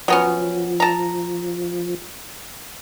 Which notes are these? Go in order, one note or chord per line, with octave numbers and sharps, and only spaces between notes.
F3 F#3 B3 C#4
A5 A#5